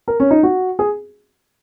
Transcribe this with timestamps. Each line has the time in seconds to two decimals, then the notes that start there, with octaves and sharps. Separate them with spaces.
0.08 A#4
0.20 C#4
0.31 D#4
0.43 F#4
0.79 G#4